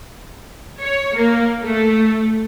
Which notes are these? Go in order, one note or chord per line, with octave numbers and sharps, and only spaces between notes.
C#5
A#3
A3